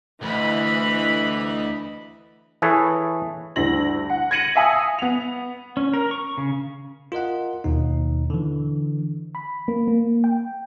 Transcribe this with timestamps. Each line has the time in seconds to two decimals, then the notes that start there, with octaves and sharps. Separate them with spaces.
0.23 D2 E3 D#5 B5
2.62 E3 G#4 A4 B4 C#5
3.56 D2 G2 E4 A#6 F#7
4.10 F#5
4.31 G#6 A#6 C#7 D#7 F#7
4.55 E5 F5 G#5 D#6
4.99 B3 F7
5.77 C#4
5.94 A#4
6.11 C#6
6.38 C#3
7.12 F4 A#4 D#5 F#5
7.64 D#2 B2 D#4
8.30 D3 E3
9.35 B5
9.68 A#3
9.88 A#3
10.24 G5